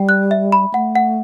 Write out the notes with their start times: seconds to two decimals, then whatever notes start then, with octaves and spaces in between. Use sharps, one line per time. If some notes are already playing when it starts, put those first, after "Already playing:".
Already playing: G3 G5
0.09 F#6
0.31 E5
0.52 B5
0.74 A3 F#5
0.96 F#5